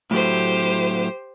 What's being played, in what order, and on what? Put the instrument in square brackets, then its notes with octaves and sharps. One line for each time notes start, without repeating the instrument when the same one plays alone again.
[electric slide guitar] A2 F#3 A3 [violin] G4 C5